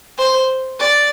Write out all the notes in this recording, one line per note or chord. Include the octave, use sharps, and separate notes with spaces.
C5
D5